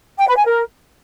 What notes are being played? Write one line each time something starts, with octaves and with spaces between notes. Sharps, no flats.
G5
B4
G#5
A#4